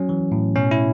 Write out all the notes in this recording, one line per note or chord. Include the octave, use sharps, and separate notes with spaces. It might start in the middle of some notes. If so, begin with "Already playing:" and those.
Already playing: F#3 C#4
E3
A2
B2 C#4
E4